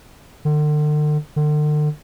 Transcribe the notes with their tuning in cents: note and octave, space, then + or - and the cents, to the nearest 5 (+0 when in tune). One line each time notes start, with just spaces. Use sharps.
D3 +40
D3 +40